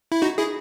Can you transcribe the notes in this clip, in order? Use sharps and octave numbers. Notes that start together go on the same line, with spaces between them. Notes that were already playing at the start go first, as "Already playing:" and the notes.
E4
D#4 F#4
E4 G#4